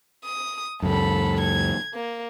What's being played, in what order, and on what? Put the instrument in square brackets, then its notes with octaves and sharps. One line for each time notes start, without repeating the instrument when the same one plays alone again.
[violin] D#6
[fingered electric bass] C#2 F#2 [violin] A4 B5
[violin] G#6
A#3